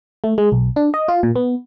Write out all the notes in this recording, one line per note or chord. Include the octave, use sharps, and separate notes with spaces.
A3
G#3
B1
D4
D#5
F4
A#2
B3